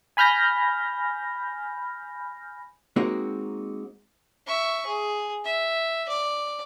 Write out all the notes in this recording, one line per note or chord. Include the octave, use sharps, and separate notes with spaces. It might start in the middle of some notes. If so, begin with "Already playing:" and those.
G#5 B5 F6 G6 A#6
G#3 A#3 C4 D#4 F#4
E5 C#6
G#4
E5
D5